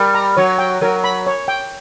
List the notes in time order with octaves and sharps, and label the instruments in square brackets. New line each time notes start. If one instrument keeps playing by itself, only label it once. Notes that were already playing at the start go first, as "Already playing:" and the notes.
Already playing: [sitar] G3 [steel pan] A#4
[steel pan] A#5
[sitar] F#3 [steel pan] C#5
[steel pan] G5
[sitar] F#3 [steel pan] A#4
[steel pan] B5
C#5
G5